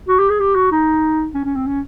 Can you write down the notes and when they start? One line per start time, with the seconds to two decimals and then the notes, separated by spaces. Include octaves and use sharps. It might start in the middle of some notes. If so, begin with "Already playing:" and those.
0.08 F#4
0.19 G4
0.30 G#4
0.40 G4
0.55 F#4
0.72 D#4
1.34 C#4
1.45 C#4
1.56 C4
1.67 C#4